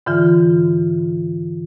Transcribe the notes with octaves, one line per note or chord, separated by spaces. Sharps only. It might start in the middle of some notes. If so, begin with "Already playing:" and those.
G#2 D3 E3 F4